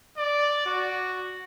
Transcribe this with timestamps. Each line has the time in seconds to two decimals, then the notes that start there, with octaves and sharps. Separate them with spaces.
0.18 D5
0.66 F#4